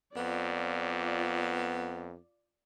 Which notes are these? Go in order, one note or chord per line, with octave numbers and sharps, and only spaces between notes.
F2 B3 F4 D5